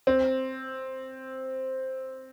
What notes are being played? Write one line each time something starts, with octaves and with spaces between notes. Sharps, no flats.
C4